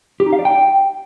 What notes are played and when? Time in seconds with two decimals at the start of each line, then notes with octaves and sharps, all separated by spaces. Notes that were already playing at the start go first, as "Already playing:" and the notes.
0.20 G4
0.26 D#4
0.33 F5
0.39 D5
0.45 G5